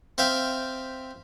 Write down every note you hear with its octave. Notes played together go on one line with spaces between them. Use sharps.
C4 E5 F5 G5